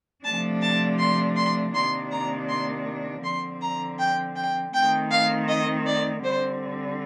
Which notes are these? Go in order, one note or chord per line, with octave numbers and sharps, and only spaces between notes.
C3 F3 A3 D4 A5
A5
C6
C6
C3 D#3 A#3 D4 C6
A#5
C6
D3 F3 C4 C6
A#5
G5
G5
D#3 A3 C4 G5
F5
D#5
D5
D3 G3 C4 C5